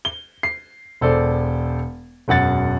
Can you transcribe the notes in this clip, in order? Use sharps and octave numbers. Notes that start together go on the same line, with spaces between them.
G7
C7
E1 A4 C5 D5
E1 F#2 F#5 A6